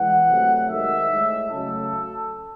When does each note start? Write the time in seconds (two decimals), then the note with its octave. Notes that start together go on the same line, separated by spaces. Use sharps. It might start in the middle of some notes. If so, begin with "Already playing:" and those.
Already playing: E3 G#3 F#5
0.27 C3 F#3 A3
0.69 D#3 G#3 E5
1.10 A2 G#3
1.50 C#3 F#3 A3 A4